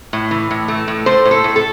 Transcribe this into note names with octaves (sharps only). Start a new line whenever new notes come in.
A2
E3
A2
A3
A2
A2 C5
A2
A4
A2
A4